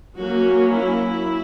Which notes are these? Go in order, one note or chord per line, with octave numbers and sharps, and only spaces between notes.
F#3 A#3 C#4 F#4
E4